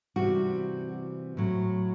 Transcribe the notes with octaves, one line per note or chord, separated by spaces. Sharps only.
C3 E3 G3 F#4
A2 F#3